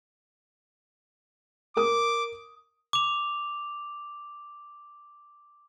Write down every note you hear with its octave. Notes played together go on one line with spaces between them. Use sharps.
A#4 D6 D#6
D6 F7